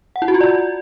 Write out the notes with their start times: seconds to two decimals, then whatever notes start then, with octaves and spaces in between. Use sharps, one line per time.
0.16 F#5
0.22 E4
0.28 F#4
0.34 F4
0.41 D5